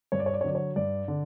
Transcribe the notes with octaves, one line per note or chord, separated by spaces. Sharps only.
G2 C#5
D5
C#5
D5
C#5
D3 F#3 D5
C#5
G2 D5
D3